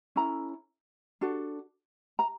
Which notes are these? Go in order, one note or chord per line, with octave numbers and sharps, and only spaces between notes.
C#4 E4 A4 A#5
D4 F#4 A4
A#5